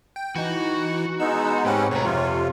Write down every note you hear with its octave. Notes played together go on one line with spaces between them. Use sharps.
G5
E3 D#4 F#4
G#3 B3 D#4 E6
G#2 C4 C#4 G4 B4 F#5
D2 B2 C#5 A#5
F2 C3 F4